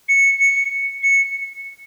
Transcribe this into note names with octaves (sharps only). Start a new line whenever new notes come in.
C#7
C#7
C#7